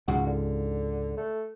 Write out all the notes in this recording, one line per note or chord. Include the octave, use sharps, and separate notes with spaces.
C#2 G#2 C#3 F#4
D3
A3